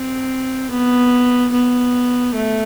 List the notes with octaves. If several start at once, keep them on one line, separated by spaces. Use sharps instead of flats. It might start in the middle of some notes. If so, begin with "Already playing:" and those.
Already playing: C4
B3
B3
A3